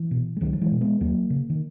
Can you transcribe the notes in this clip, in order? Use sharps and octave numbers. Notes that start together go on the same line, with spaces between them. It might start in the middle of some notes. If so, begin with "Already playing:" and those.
Already playing: E3
B2
G#3
C#2 D#3 F#3
F#3
E3 G#3
B2
G#3 B3
D#2 F#3 A#3
C#3
D#3